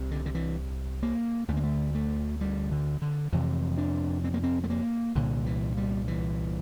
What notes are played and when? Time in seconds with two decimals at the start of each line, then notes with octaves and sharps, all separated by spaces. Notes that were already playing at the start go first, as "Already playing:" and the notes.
Already playing: C2 C3
0.11 D3
0.26 D3
0.35 E3
1.03 A#3
1.48 D2 D3 A3
1.56 A#3
1.64 A3
1.95 A3
2.41 G3
2.71 D3
3.02 D3
3.33 F2 C3 E3
3.78 D4
4.24 C4
4.34 A#3
4.43 C4
4.64 A3
4.70 A#3
5.15 C2 A#2 D3
5.46 E3
5.77 G3
6.08 E3